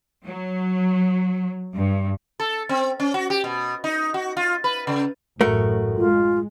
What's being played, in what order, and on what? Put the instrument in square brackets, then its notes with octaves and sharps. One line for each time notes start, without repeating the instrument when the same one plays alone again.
[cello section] F#3
G2
[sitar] A4
C4
C#4
F#4
G4
B2
D#4
F#4
F4
B4
C#3
[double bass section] A1 F#2 A2 [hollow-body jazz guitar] A3 F#4 A#4
[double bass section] G#3 [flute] F4